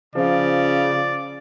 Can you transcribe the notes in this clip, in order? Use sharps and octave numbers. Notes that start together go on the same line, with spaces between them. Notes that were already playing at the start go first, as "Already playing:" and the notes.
C#3 F3 F4 D5